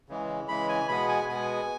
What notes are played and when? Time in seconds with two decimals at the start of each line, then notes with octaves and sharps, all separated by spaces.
0.09 C#3 E3 G#3
0.48 C#3 E3 G#3 B5
0.69 G#5
0.88 B2 G#3 B3 B5
1.09 G#5
1.29 B2 G#3 B3 G#5